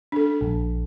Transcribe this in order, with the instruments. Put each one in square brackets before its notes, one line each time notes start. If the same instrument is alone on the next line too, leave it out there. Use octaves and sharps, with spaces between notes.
[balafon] D4 A4
[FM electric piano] A#1